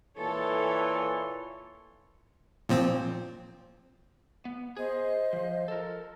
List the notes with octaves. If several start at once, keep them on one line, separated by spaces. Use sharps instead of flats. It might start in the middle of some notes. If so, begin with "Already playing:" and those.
A#2 E3 A4 C#5 C6
A#2 F3 C4
B3
G#4 C5 D#5
F3
A4 A#4